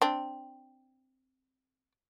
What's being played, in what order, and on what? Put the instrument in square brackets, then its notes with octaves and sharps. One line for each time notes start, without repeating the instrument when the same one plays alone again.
[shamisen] C4 D4